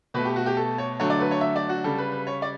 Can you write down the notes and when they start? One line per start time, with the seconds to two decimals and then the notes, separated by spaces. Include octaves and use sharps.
0.14 B2 A3 B4
0.25 G4
0.36 F#4
0.46 G4
0.57 A4
0.78 C#5
0.99 D3 F#3 A3 C#5
1.10 D5
1.20 B4
1.31 C#5
1.41 E5
1.56 D5
1.69 F#4
1.84 C#3 G3 A4
1.98 B4
2.12 B4
2.27 C#5
2.42 D5